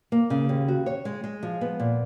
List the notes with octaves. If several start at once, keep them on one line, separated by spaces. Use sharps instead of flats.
A#3
C#3
D#2
F#4
C#5
G#3
G#3
F3
B3
A#2